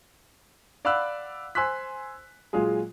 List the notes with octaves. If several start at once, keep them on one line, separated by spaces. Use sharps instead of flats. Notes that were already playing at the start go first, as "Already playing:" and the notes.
D5 F5 F#5 B5 E6 F#6
C5 G#5 C6 E6 F#6 B6
A#2 F#3 G#3 F4 G#4